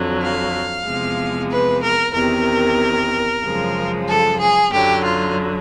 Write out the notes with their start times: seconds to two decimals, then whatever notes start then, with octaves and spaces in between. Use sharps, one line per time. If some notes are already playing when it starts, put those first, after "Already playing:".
Already playing: F2 D3 F#3
0.21 F5
0.86 E2 C3 F3 G#3
1.49 B4
1.82 A#4
2.13 E2 C3 D#3 A#4
3.43 F#2 C#3 F3 G#3
4.07 A4
4.40 G#4
4.71 F#2 D3 F#3 G4
5.03 F4